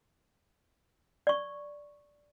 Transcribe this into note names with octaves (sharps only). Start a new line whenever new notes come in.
D5 C#6